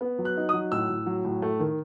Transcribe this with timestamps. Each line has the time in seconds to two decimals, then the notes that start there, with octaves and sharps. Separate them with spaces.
0.01 B3
0.19 F#3
0.25 F#6
0.37 D#4
0.49 D#6
0.54 F#3
0.72 A2 E6
0.90 A2
1.06 F#3
1.24 A2
1.42 A3
1.60 D#3